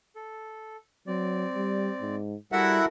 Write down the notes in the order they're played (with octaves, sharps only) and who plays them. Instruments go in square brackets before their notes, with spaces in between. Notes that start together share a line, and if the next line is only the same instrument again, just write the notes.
[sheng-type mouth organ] A4
[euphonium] F#3 [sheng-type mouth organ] C4 D5
[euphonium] G3
G#2
[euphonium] G3 [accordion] E4 E5 F#5 [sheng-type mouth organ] F#4 A4 A#4